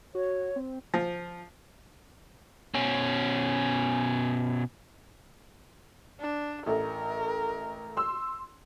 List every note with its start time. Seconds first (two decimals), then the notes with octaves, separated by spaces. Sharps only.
0.15 F#4 C#5
0.56 C4
0.94 F3
2.74 B2 C#4
6.20 D4
6.66 A1 A3 A#4
7.97 C6 E6